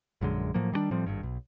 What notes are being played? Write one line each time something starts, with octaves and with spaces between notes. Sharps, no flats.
A#1 F#2 D3 G#3
A2 F3 F#3 A#3
D#3 G3 G#3 D4
A2 F3 G3 C4
G#1 G2
B1